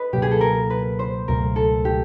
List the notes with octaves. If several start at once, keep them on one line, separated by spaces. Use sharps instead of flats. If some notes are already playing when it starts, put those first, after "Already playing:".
Already playing: B4 D#5
C#2 B2 F#3 A#3 G4
G#4
A4
A#4
B4
C5
C#2 B2 F#3 A3 A#4
A4
G4